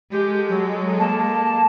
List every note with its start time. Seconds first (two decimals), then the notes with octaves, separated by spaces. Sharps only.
0.12 G#3 G4 A4
0.49 F#3
0.99 A#3 A5